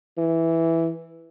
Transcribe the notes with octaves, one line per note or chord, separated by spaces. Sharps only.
E3